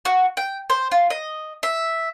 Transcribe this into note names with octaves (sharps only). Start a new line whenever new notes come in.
F#4
G5
C5
F4
D#5
E5